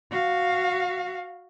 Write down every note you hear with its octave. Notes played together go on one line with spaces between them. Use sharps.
F#4 F5